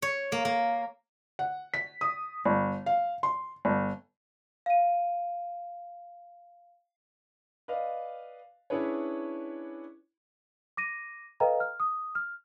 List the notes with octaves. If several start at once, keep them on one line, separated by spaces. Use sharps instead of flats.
C#5
A#3
A#3
F#5
B6
D#6
G1
F5
C6
G1
F5 D#7
B4 D5 D#5 F5
C#4 D4 E4 G#4 B4 C#5
D6 A#6 D#7
A4 B4 D#5 F5 G5 A#5
F6
D#6
F6